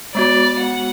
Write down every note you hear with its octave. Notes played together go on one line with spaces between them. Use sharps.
G#3 B3 F#4 D5
F#5